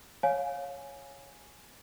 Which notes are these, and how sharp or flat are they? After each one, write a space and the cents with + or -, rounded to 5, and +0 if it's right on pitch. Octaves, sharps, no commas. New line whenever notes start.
C#5 +0 F5 +20 G#5 +0